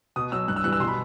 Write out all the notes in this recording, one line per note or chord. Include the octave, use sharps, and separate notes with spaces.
B2 D#6
F#3 E6
G2 F#6
E6
E3 G3 F#6
E6
B2 C6
B5